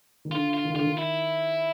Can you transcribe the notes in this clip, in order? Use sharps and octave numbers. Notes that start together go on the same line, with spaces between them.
D#3
D3 F4
F4
D#3
D3 F4
D#3
E4